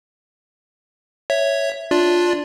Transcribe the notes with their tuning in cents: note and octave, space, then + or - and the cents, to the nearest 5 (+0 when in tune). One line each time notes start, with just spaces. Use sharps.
C#5 +0 E5 +0
D4 +0 F4 +10 D5 +0